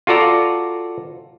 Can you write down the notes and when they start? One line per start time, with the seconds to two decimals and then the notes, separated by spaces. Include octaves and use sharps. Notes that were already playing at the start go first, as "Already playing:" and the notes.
0.07 F4 F#4 A4 D5 A#5